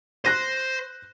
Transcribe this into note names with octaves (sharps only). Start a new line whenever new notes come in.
C5 C6 F#6 A#6 D#7